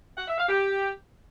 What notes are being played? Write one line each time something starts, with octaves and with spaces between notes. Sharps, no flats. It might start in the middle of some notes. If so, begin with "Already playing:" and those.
F#5
E5
F5
G4